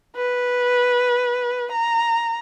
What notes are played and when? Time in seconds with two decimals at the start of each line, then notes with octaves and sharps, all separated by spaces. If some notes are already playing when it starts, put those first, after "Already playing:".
0.16 B4
1.72 A#5